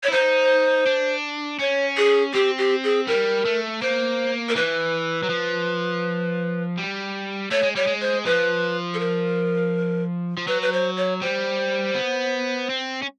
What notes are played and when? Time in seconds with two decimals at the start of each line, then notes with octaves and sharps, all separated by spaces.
0.03 C#5
0.08 E4
0.12 D#4 C5
0.86 D4
1.59 C#4 C#5
1.97 G#4
2.34 C4 G4
2.58 G4
2.84 G#4
3.07 G3 A#4
3.45 A3
3.81 A#3 C5
4.49 A#4
4.55 E3 B4
5.23 F#3
5.29 F3
6.78 G3
7.51 A3 C#5
7.63 G#3
7.75 G3 C#5
7.87 G#3
8.01 C5
8.25 F3 B4
8.94 A4
8.99 A#4
10.37 F3
10.47 F#3 B4
10.62 B4
10.72 C5
10.97 C#5
11.22 G3 C5
11.95 B3
12.70 C4
13.02 C#4